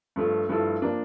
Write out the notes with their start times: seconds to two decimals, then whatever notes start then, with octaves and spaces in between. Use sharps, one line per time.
0.16 G2 F3 A3
0.49 G2 F3 A3 E4 A4
0.82 F3 A#3 D4